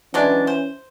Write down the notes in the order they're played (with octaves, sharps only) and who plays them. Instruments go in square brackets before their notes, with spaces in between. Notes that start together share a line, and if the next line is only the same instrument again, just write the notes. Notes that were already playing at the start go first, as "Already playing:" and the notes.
[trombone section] E3 [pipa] F#3 G#3 D4 [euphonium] C#4
[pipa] C5